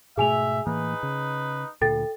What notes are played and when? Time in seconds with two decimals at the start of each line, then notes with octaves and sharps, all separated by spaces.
0.17 G#2 B2 A3 G#4 E5 G#5 F7
0.67 A2 E3 A#3 D#4 B4
1.03 C#3
1.81 D2 A#2 A4 G5 A6